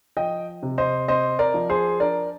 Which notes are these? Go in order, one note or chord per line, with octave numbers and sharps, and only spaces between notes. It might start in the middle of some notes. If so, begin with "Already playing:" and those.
F3 D#5 G5
C3
C5 D#5
C4 C5 D#5
A#4 D5
F3
G#4 C5
D4 A#4 D5